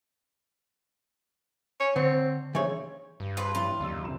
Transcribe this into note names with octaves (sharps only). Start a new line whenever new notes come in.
C#5
D3 C4
C#3 E3 C5 C#5
G2
F4 B4
A1 E4 F4 F7
F#1 D#2 D5 E6
G1 C3 E7